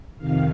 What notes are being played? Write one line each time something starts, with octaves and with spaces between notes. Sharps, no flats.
F2 C3 D#3 F5